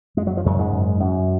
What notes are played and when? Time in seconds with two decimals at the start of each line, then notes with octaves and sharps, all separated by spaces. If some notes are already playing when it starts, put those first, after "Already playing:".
0.17 F#2 G#3
0.27 F#3
0.37 F3
0.45 F#2 C#3 F#3
0.58 G#2 G#3
0.73 F#2
1.00 F#2